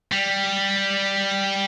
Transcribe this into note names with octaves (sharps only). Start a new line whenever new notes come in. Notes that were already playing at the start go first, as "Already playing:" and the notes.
G3